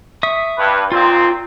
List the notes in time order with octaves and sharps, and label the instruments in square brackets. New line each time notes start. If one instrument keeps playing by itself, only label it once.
[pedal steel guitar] E5 C#6 D#6
[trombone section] G2 B4
[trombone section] A#2 D#3 C4 [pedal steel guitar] F4